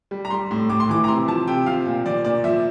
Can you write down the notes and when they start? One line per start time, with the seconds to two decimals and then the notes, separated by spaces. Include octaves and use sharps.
0.11 G3
0.25 A#5
0.30 G3 C6
0.51 A2
0.69 A2 D6
0.80 C6
0.89 E3 D6
1.04 A#5
1.08 C3 C6
1.28 F3 A5
1.48 C3 G5
1.66 F3 F5
1.87 A#2
2.06 F3 D5
2.25 A#2 D5
2.44 F3 E5